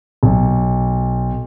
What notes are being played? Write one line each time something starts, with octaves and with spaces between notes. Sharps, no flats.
B1